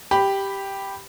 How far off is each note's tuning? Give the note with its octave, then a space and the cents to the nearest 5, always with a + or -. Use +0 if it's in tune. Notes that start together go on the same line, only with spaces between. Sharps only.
G4 +0 B5 +0